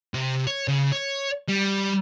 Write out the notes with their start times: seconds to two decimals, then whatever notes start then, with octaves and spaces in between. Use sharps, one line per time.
0.14 C3
0.47 C#5
0.68 C#3
0.92 C#5
1.48 G3